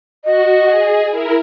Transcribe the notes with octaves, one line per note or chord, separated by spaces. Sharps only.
F#4 D#5
G#4
E4 A#4